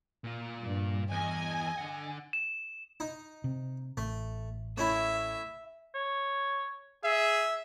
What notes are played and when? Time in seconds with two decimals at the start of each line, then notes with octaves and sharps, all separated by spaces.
0.24 A#2 F4
0.61 G2
1.11 E2 D#5 G#5
1.78 D3 F#5
2.33 E7
3.00 D#4
3.44 C3
3.97 A1 A3
4.78 A3 C#4 E4 E5
5.95 C#5
7.04 G#4 E5